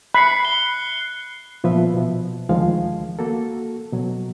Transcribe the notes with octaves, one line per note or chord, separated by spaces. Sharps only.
B5 F#6 C7 C#7
G7
A#2 F3 B3 B4 E5
B2 F3
D2 D#3 F3 G#3 F5
A#3 F#4 A4
B2 F#3